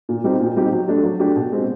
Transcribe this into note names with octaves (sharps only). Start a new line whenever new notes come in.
A#2
G3 C4 D#4 G4
A#2
G3 C4 D#4 G4
F#3
A3 D4 G4
F#3
A3 D4 G4
B2
G#3 C4